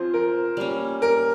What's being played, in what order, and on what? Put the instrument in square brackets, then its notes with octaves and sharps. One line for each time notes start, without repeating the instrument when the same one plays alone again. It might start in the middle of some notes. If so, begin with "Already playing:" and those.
Already playing: [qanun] F3 C4 F4 G#4 [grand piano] C5
[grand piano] A#4
[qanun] G3 A#3 C#4
[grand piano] A#4